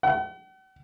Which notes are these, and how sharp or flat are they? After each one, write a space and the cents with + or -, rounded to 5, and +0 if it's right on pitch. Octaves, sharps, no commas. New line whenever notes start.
F#5 +45